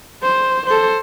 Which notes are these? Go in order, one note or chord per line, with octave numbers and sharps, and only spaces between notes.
C5
A4 C5